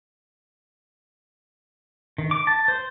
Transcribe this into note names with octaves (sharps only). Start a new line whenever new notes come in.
D#3
D6
A5
C5